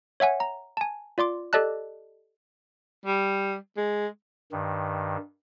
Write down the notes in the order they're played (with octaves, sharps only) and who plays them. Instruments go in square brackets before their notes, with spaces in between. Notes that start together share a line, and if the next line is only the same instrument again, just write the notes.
[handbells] C#5 E5 F#5 G#5
A#5
G#5 A5
F4 D5 C6 D6
G4 A4 D5 D#5 A5 F#6
[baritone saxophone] G3
G#3
[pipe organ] G2 D#3